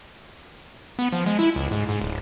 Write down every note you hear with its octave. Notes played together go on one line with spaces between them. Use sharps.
B3
F3
G#3
E4
C#2
G#2
G#2
D1